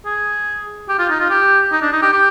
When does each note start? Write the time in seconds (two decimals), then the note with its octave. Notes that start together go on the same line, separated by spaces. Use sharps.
0.05 G#4
0.89 G4
0.99 F4
1.10 D#4
1.20 F4
1.30 G4
1.72 D#4
1.82 D4
1.93 D#4
2.02 G4
2.13 G4